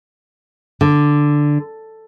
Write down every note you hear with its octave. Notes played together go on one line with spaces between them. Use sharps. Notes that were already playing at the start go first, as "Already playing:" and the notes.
D3